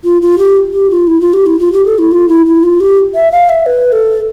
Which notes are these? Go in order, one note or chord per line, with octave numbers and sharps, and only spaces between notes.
F4
F4
G4
G4
F4
E4
F4
G4
E4
F4
G4
A4
E4
F4
E4
E4
F4
G4
E5
F5
E5
B4
A4